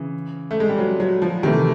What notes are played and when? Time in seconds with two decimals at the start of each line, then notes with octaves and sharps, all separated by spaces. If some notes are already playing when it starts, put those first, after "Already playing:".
Already playing: C#3 E3
0.51 A3
0.60 G#3
0.69 G3
0.79 F#3
1.00 F#3
1.22 F3
1.43 C3 D#3 E3 A3